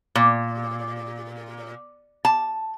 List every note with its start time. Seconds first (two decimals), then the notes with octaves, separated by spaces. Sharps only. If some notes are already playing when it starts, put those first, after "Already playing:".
0.15 A#2
2.25 A5